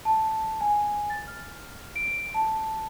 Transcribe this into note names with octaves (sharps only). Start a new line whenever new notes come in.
A5
G#5
A6
F6
D7
A5